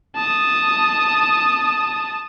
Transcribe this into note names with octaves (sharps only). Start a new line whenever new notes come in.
A5 D#6